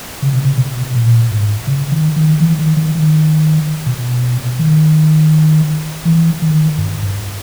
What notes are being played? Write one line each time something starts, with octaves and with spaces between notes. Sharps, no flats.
C#3
B2
C#3
B2
A#2
G#2
C#3
D#3
D#3
E3
D#3
D#3
D#3
B2
D#3
E3
D#3
G2
G2